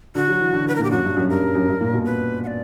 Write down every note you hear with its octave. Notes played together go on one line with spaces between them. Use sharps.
D3 F#4
F#3
E3
D3
B4
A#4
A#2
G4
F#2 F#4
G2
F#2
G2 A#4
G2
F#2
G2
A#2
B2
B4
F#5
D5